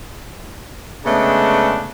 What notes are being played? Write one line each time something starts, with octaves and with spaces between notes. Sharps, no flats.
C#3 G#3 A3 B3 D4